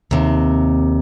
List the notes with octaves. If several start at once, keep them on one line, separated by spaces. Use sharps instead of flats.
D#2 C3